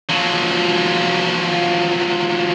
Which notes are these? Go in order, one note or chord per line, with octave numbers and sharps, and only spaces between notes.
F3 F#3